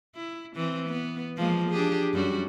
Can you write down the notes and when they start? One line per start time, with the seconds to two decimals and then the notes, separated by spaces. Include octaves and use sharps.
0.15 E4
0.56 E3 C4
0.89 B3
1.37 F3 G#3 A#3
1.70 D4 G4 G#4
2.14 F#2 G3 F#4